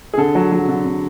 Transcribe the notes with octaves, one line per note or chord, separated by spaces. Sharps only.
G#4
D3 A4
F#3
F#3
D3
D3